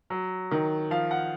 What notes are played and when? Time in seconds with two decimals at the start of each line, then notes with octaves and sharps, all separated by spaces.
0.10 F#3
0.51 D#3
0.91 F3 F5
1.11 F#5